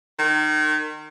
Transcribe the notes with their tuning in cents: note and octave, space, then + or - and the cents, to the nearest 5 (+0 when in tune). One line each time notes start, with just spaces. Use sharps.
D#3 -25